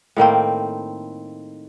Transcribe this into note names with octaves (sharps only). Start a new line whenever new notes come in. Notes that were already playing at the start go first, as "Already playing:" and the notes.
A2 D#3 A#3 C4